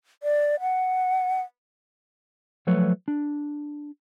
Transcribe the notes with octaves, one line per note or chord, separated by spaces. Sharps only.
D5
F#5
F3 F#3 A3 B4 C#5
D4